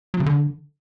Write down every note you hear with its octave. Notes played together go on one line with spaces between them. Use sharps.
F#3
C#3
D3